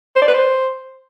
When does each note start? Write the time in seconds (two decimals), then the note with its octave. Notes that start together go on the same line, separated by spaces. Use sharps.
0.16 C5
0.22 D5
0.28 B4
0.34 C5